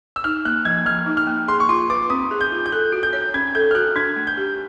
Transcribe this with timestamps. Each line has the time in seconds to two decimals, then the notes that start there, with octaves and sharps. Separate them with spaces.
0.16 E6
0.24 D#4 F6
0.45 A#3 F#6
0.65 F3 G#6
0.86 F3 F6
1.06 D#4
1.17 F6
1.27 A#3
1.48 G#4 C6
1.60 C#6
1.69 F4 C6
1.90 B4 D6
2.10 C4 D#6
2.31 G#4
2.41 G6
2.52 F4
2.66 G6
2.72 A4 F#6
2.92 F#4
3.03 G6
3.13 C#5
3.34 C#4 G#6
3.55 A4 G6
3.71 F6
3.75 F#4 F#6
3.96 D4 G#6
4.16 A3
4.27 G6
4.37 G4